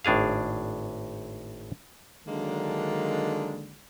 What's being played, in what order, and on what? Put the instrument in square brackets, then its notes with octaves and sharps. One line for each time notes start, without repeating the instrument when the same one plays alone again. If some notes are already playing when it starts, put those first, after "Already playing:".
[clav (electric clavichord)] G#1 A2 D4 G#4 F5
[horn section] D3 D#3 F#3 G#3 A#3 D4